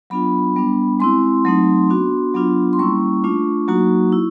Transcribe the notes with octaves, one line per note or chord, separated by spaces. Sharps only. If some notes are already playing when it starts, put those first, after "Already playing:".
F#3 B3 D4 F4 B5
G3 B3 D4
G#3 C4 E4 C6
F#3 A3 C4 D#4
B3 D4 F#4
F#3 B3 D4 F4
C6
G3 A#3 C#4 E4 C#6
A3 D4 F4
F#3 A#3 D#4 F#4
E4